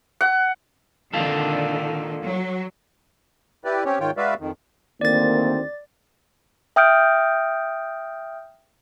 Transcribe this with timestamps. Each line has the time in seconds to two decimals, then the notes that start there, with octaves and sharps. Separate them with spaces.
0.21 F#5
1.14 D3 D#3 A#3 F4 A4
2.23 F#3
3.65 E4 G4 B4 D5
3.85 C4 C#4 G4 C#5
4.00 G#2 D#3 F4 C#5 G5
4.17 G#3 F#4 B4 D5 E5 F5
4.40 F2 D#3
5.01 D2 D#3 A#3 C4 D5 A6
6.76 E5 G5 D#6 F6 G6 D7